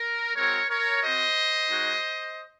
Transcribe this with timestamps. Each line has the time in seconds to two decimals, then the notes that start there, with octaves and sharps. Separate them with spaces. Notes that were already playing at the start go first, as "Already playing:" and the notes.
Already playing: A#4
0.36 G#3 C4 F#4 A#4 C#5
0.69 A#4 C#5
1.02 C4 F#4 C5 D#5
1.69 G#3 D#4 F#4